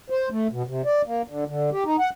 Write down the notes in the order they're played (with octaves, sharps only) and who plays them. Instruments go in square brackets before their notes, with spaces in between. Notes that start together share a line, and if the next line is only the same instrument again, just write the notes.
[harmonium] C5
A3
B2
C3
D5
A#3
D3
D3
G4
D#4
F#5